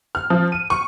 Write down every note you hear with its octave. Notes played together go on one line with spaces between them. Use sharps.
F6
F3
D#7
C#6